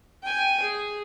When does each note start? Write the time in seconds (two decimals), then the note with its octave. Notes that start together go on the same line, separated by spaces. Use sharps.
0.23 G5 G#5
0.62 G#4